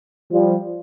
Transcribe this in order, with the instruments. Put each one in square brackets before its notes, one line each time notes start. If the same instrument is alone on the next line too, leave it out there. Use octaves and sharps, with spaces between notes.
[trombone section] F3 G3